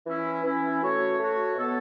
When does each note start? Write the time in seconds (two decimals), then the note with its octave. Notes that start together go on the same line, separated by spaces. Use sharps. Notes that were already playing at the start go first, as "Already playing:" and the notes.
0.05 E3 C#4 E4
0.44 E3 C#4 E4
0.81 A3 F#4 C#5
1.18 A3 F#4 C#5
1.56 B2 B3 A4 C#5